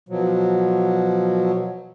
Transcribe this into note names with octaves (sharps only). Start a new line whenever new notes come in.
B2 F3 F#3